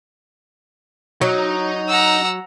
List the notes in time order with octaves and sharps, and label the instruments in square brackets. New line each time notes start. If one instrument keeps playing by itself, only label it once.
[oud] F#3 [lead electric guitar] D#4 D#5
[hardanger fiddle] F#5 A#5 [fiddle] E6